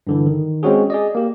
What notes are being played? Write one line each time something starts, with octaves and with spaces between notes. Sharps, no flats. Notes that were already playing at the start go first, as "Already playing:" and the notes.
G2 D3 E3
D#3
G#3 C4 C#4 F#4 G#4
G#4 D5 D#5
A#3 G4